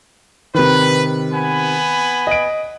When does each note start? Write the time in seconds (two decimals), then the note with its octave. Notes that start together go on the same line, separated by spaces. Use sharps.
0.54 C3 D#3 B4
1.33 B3 G#5 B5
2.27 D#5 D7